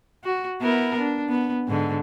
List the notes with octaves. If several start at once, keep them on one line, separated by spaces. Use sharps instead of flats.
F#4
B3 E4 A#4
D4
B3
G#2 D3